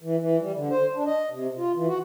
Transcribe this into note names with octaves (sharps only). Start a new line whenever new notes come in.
E3
E3
G3
D3
C5
D4
D#5
C3
F4
E3
F#4